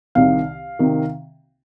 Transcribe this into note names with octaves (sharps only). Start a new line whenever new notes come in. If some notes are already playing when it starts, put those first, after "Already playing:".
C2 C3 D#3 F5
C3 D#3